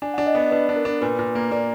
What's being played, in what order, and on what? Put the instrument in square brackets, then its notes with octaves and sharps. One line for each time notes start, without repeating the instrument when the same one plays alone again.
[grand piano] D4 [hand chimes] G#5
[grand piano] D4 [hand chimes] F#5
[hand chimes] D#5
[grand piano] B3 [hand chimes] D5
[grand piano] D4 [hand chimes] B4
[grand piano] D4
[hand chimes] A#4
[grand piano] D4
[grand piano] A#2 [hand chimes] B4
[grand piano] A#2
A#3
[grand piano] A#3 [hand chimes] D5